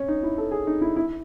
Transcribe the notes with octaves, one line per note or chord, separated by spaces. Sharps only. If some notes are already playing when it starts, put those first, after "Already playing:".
Already playing: C#4
D#4
E4
A4
G#4
D#4
E4
E4